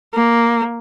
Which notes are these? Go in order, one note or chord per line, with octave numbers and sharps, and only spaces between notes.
A#3